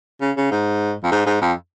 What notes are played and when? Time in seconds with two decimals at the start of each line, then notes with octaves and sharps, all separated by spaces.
0.21 C#3
0.36 C#3
0.51 G#2
1.03 F2
1.11 G#2
1.26 G#2
1.41 F2